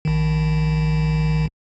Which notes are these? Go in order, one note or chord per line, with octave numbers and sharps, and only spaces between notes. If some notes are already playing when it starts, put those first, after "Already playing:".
A#1 D#3